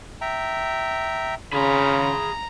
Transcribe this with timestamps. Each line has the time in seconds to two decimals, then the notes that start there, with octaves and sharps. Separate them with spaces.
0.21 E5 G5 A#5
1.53 C#3 F4 G#4 A#5 B5